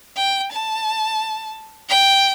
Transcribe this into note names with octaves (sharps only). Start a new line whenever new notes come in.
G5
A5
G5